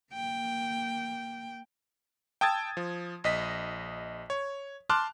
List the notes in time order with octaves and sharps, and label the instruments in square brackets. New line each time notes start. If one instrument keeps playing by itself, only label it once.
[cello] A#3 G5
[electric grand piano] G5 A5 D#6 E6 G#6 A6
F3
A#1 D#5 B6
C#5
A5 C6 D6 F6 F#6